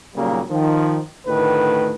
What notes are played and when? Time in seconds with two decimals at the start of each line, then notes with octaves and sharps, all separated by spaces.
0.16 D#2 A#2 C#3 F#3 G3 A#3
0.50 D#3 F3
1.27 D2 A2 D3 D#3 B4